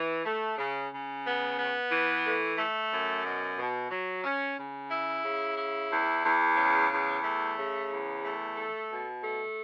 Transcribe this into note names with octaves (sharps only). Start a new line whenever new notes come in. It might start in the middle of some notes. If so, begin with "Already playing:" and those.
Already playing: E3
A3
C#3
C#3
B3
B3
E3
A3
A3
F#2
B2
B2
F#3
C#4
C#3
E4
C#3
E4
E2
E2
C#3
E2
A3
C#3
E2
A3
A4
B2
A3